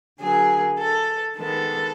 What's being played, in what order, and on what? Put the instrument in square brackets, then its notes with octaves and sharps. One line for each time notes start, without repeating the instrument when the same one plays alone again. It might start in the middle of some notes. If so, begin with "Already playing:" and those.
[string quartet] D3 F#3 A#3 G#4
A4
D#3 G#3 B3 A4